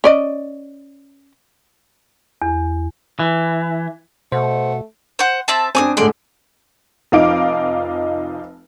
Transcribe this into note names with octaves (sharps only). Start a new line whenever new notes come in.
C#4 D5 D#5
E2
E3
B2 A3 C5 F#5
C5 F#5
C4 E5 A5
C4 D4 G#5 D6 D#6
A2 D3 G#3 D5 C6
F1 F3 D#4 F5 D6 D7